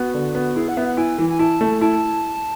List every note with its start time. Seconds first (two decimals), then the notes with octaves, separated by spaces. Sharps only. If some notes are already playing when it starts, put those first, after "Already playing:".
Already playing: B3 F#4
0.14 D3
0.35 B3
0.56 E4 G#4
0.68 F#5
0.77 B3 E5
0.87 F#5
0.97 E4 G#5
1.18 E3
1.30 G#5
1.39 E4 A5
1.61 A3
1.81 E4 A5